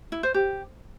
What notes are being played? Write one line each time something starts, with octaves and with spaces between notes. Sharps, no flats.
E4
C5
G4